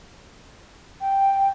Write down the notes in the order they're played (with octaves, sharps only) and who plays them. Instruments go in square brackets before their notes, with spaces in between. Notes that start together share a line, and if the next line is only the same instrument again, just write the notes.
[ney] G5